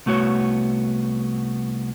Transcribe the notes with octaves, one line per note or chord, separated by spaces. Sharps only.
C2 A3 B3 F#4 C#5